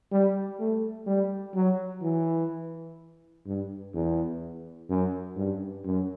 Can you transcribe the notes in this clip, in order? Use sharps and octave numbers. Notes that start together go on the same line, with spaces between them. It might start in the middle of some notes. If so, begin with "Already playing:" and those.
G3
A3
G3
F#3
E3
G2
E2
F#2
G2
F#2